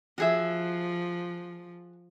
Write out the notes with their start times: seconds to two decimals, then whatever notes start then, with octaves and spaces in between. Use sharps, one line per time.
0.18 F3 F#4 G#4 E5